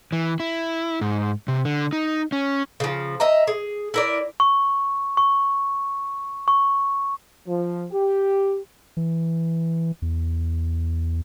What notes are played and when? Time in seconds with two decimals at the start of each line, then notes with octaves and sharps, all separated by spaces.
0.12 E3
0.40 E4
1.01 G#2
1.48 C3
1.65 D3
1.93 D#4
2.32 C#4
2.80 C#3 F3
3.20 D#5 E5 A#5
3.47 G#4
3.94 E4 A#4 D5
4.40 C#6
5.17 C#6
6.48 C#6
7.47 F3
7.91 G4
8.97 E3
10.02 E2